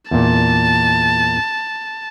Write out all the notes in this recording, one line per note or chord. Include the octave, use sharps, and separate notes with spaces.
E2 A#2 A5